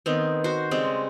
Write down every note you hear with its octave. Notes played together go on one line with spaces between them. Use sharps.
D#3 B3 C4
F#4 C5
C#3 G3 G#3 C4